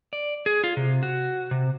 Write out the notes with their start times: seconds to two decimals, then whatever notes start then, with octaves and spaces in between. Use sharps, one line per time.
0.13 D5
0.46 G#4
0.64 F4
0.77 C3
1.03 F#4
1.51 C3